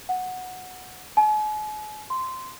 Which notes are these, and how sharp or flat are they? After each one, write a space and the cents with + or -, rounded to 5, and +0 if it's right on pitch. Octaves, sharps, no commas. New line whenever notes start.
F#5 -10
G#5 +45
C6 -10